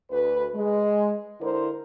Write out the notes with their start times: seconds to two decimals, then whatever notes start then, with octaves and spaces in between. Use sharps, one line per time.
0.10 D2 B4
0.55 G#3
1.41 D3 E4 A#4 C5